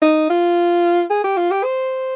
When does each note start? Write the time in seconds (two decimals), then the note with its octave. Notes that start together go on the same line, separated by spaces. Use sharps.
0.02 D#4
0.30 F4
1.10 G#4
1.24 G4
1.37 F4
1.51 G4
1.64 C5